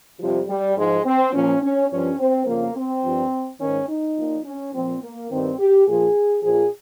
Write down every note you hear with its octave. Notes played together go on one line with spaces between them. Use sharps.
F2 C3 F3 G3
G3
G#2 F3 G#3
C4
A#2 F3 C#4
C#4
G2 F3 C#4
C4
F2 C#3 F3 A#3
C4
G2 F3
G#2 D#3 C#4
D#4
A#2 F3
C#4
A#2 F3 C4
A#3
G2 D#3 C4
G4
A#2 F3 G#4
A#2 F3 G#4